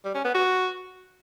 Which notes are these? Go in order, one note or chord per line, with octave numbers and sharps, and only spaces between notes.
G3
C#4
B3
F#4